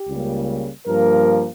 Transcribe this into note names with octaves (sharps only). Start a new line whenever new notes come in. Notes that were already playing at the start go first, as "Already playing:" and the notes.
Already playing: G4
C#2 C#3 G3 A#3
G2 F3 A#3 A#4